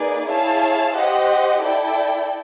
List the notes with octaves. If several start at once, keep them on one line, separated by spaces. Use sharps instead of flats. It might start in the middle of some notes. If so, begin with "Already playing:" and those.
Already playing: A#3 D#4 G#4 B4 D5
E4 G#4 C#5 F5 A5
G4 C5 D#5 F#5
E4 A4 D5 G5